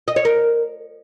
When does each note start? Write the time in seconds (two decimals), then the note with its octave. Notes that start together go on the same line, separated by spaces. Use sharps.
0.08 D#5
0.16 C#5
0.25 A#4